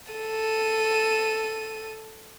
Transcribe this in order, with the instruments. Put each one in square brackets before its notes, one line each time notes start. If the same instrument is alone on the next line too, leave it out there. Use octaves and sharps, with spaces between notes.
[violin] A4 D#7